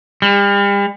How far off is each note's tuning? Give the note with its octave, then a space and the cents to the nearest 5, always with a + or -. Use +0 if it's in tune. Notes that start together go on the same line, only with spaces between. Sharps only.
G3 +40